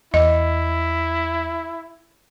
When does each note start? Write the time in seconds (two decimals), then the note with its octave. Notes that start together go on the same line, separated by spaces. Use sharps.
0.14 E2 E4 D#5